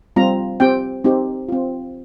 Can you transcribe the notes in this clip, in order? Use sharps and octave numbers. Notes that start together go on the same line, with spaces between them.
G3 C4 F4 A#5
C4 G4 G5
C4 D#4 G4
C4 F4